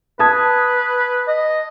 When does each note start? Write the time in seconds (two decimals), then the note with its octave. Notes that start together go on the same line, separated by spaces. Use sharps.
0.19 B4 A5 D#6 G#6
1.28 D#5